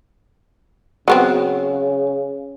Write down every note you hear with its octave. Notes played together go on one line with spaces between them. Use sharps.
C#3 F#3 B3 C4